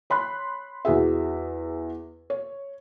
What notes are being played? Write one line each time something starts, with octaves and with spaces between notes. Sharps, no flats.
C#5 B5 C6 F#6
E2 F#4 G#4 E5
C#5